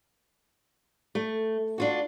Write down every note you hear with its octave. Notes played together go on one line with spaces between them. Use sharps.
A3
D4 F4 F#4